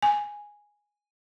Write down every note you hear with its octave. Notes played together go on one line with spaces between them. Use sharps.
G#5